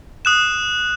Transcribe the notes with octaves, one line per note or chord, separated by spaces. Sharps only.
D#6 F#6 E7